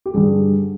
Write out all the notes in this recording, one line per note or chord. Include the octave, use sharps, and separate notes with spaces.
G4
G2 D3 G3 G#4